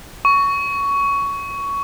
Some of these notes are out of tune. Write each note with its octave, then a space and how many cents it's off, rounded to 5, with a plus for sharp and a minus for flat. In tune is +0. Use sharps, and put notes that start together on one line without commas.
C#6 +15